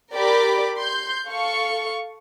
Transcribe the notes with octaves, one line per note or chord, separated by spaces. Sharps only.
G4 A#4 D5 B5 D6
C6 G6
A4 F5 C#6